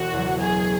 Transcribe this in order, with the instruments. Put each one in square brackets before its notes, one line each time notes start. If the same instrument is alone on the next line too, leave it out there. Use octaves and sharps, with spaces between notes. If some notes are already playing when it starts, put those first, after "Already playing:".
Already playing: [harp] E1 [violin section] F#4
[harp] E2 C#3 F#3
[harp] C#2 [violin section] G#4